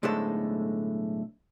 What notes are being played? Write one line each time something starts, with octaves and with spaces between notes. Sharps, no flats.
B1 A2 D3 G#3 A4 C5